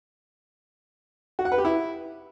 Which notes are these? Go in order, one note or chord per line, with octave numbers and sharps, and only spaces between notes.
F#4
F#5
B4
G4
E4